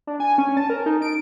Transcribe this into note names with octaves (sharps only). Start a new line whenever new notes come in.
D4
G#5
C#4
A5
A#4
D#4
D7